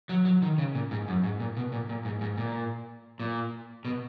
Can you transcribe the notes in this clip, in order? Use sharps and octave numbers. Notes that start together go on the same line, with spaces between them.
F#3
F#3
D#3
C#3
A#2
G#2
F#2
G#2
A#2
B2
A#2
A#2
G#2
G#2
A#2
A#2
B2